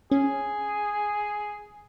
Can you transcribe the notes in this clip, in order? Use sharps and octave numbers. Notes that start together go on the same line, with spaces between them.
C#4 G#4